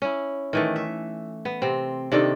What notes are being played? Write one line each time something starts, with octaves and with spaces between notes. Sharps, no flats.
C#4 E4
D#3 E3 A3
E5
B3
C3 C4
C3 D#3 D4 A4